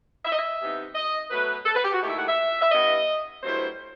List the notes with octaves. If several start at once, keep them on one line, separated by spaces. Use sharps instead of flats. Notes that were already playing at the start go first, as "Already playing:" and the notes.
E5
D#5
E5
C3 E3 B3 D#4
D#5
B2 F#3 A3 B4
A4
B4
G4
F#4
D#2 D#3 A3 E4 G4
E5
F#5
E5
E5
G2 E3 B3 E4 D#5
G2 F#3 A3 E4 C5